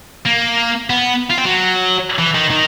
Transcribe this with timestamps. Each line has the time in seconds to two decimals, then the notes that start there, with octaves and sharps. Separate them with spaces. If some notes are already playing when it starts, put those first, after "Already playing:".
0.25 A#3
0.90 B3
1.31 F4
1.38 C4
1.46 F#3
2.19 E3
2.35 D#3
2.51 D#3